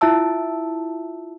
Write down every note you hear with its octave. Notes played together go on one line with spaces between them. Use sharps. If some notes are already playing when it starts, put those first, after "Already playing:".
E4 F4 E5 A5 E6